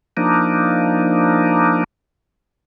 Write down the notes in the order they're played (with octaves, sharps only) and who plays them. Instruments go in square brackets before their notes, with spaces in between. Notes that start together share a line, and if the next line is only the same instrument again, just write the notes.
[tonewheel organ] F3 A#3 D4 D#4